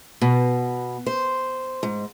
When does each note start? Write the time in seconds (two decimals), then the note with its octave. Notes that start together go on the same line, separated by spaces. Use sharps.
0.21 B2
1.06 C5
1.83 G#2